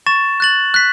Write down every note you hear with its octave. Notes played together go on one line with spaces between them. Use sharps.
C#6 A6 E7
F#6 A6 F#7
F#6 B6